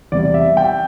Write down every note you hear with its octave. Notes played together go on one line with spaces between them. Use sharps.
E2 C3 G3 D5
E5
G5